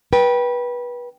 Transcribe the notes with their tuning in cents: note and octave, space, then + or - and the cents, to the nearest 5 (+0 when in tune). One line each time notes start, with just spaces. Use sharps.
B4 -25 G5 +0